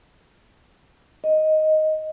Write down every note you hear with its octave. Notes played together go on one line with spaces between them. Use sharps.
D#5